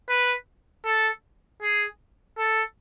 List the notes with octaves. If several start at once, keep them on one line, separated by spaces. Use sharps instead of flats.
B4
A4
G#4
A4